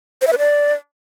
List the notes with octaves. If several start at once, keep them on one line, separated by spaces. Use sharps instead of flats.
C5
E5
B4
D5